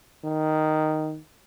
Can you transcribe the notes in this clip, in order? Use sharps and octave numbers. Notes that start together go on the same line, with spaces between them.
D#3